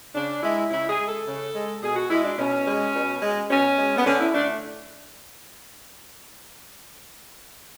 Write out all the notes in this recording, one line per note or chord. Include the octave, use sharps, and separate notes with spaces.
C#3 D4
G#3 E4
C#3 E4
G#4
G#3
A4
C#3
G#3
B2 G#4
F#4
G#3 E4
D4
B2 C#4
G#3
B2
G#3
B2 C#4
G#3
B3
D3 C#4
E4
A3 D4